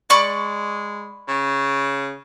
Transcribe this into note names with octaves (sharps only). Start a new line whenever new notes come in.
G#3 D5 B5 C#6
C#3